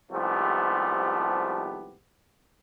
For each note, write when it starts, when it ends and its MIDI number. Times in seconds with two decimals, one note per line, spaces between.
0.11 1.95 36
0.11 1.95 44
0.11 1.95 53
0.11 1.95 57
0.11 1.95 59
0.11 1.95 67